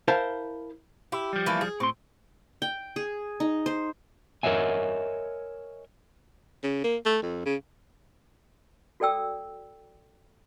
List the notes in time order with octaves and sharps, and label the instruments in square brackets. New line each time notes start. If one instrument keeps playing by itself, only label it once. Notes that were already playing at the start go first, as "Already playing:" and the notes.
[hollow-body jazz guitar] E4 A#4 C5 F5 A5
[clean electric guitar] E4 [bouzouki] G4
[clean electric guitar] F3 G3
[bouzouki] E3 A3 A#3
G#4
[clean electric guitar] A2 C6 [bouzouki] C4
[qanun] G5
G#4
D#4
C5
[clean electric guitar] A#4 C#5 D#5 E5 G#5
[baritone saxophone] C#3
A#3
A3
F2
C#3
[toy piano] F#4 A4 D5 G5 E6